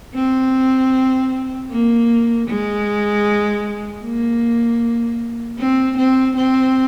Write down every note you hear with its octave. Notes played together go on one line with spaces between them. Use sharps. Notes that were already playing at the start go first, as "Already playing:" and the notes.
C4
A#3
G#3
A#3
C4
C4
C4